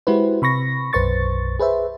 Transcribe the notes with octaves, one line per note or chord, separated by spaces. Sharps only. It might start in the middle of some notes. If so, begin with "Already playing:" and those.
G#3 E4 F#4 G4 B4 C5
C3 B5 C#6 A#6
B1 F#2 B4 C5 C#6 A6
G#4 B4 C5 E5